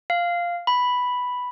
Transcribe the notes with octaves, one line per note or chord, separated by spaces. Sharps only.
F5
B5